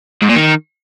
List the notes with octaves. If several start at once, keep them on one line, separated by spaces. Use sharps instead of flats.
G#2
A#2
D#3